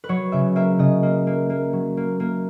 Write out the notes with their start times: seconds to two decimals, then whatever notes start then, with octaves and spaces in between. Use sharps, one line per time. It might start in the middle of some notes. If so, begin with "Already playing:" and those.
0.04 B4
0.09 F#3 C#5
0.32 C#3 E5
0.56 A#3 E5
0.79 C#3 D#5
1.03 A#3
1.27 A#3
1.50 A#3
1.73 F#3
1.97 A#3
2.20 A#3